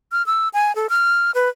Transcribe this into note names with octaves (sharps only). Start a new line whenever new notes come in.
F6
E6
G#5
A4
F6
B4